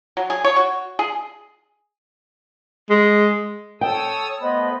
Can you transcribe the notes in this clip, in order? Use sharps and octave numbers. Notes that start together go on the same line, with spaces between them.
F#3
G#4
C#5
F#4
G#4
G#3
A4 C#5 G5 D#6 E6
A3 B3 C5 D#5 B5